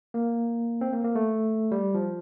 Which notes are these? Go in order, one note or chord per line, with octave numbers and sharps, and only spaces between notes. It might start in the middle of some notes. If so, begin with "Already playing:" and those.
A#3
C4
A#3
A#3
A3
G3
F3